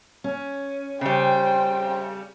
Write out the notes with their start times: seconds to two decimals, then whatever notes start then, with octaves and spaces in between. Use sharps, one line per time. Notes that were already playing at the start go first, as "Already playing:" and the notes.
0.24 C#4
1.01 C#3 G3 C5 G5